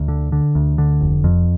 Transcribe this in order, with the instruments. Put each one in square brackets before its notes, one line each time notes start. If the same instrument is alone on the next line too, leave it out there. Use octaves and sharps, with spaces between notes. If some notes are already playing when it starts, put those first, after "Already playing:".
Already playing: [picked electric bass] D2
D3
D3
D2
D3
F1
F2